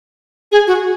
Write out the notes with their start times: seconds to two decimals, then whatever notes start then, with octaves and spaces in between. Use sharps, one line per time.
0.52 G#4
0.67 F#4